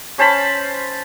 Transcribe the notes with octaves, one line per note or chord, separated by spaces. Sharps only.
C#4 C5 A5 B5